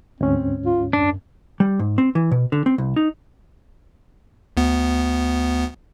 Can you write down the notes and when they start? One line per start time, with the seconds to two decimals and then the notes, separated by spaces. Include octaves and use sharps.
0.21 D2 G#2 C4 C#4
0.65 F4
0.93 F#2 D4
1.60 G3
1.79 G#2
1.98 C4
2.15 E3
2.31 B2
2.52 D3
2.66 C4
2.78 C2
2.96 D#4
4.57 D2 B3